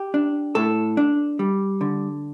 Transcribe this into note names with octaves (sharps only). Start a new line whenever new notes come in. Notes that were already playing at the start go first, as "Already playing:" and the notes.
Already playing: G4
D4
A2 A4
D4
G3
D3